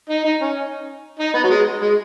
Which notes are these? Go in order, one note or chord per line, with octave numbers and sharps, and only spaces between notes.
D#4
D#4
C#4
D#4
B3
F#3
G#3
G#3